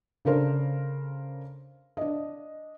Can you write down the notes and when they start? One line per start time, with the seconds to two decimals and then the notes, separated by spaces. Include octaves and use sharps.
0.25 C#3 D4 A4 A#4 C5
1.97 D4 D#5